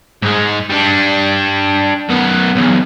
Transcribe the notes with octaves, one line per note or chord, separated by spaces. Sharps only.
G#2 G#3
G3 D4
F#2 B3
B1 E2